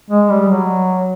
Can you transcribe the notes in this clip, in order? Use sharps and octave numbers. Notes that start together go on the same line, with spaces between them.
G#3
G3
F#3